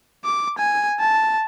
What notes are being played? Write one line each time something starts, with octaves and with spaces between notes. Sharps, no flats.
D6
G#5
A5